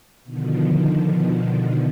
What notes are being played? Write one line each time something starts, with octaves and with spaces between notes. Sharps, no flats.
B2 D3 D#3 F3